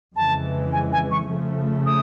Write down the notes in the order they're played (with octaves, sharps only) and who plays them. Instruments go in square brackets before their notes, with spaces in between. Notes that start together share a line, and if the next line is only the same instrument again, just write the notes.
[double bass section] F2 C#3 E3 G#3 [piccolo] A5
[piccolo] G#5
G#5
C#6
[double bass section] C#3 F3 A3
[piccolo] D#6